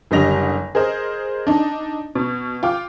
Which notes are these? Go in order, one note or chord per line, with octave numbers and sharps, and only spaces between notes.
F#1 D3 G3 D#5 A#6 F7
G#4 A#4 C5 D#5
D4 D#4
B2
F4 G5 D6